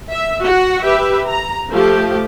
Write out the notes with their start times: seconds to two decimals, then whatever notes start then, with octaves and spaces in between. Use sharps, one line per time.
0.11 E5
0.44 F#4 F#5
0.85 G4 B4 E5
1.27 A#5
1.71 F3 A3 G4